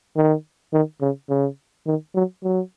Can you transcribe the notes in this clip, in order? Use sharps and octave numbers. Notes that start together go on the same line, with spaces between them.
D#3
D#3
C#3
C#3
D#3
F#3
F#3